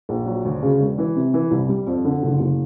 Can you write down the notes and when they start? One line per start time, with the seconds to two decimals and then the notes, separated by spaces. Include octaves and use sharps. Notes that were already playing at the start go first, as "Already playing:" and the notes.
0.09 A#1
0.26 F#3
0.45 D2
0.63 C#3
0.80 E1
0.98 E3
1.16 C3
1.34 E3
1.51 C2
1.69 G3
1.87 F2
2.05 D3
2.23 F#1
2.40 F#1